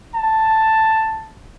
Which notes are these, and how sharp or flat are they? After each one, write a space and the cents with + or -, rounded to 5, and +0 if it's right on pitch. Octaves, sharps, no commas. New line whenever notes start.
A5 +5